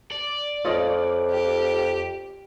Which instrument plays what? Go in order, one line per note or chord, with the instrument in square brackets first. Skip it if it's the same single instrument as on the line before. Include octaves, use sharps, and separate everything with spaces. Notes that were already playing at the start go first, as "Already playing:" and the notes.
[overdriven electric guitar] D5
[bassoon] F2 [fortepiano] F4 C#5 D#5
[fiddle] G4